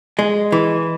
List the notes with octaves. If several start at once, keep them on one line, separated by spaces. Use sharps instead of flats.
G#3
E3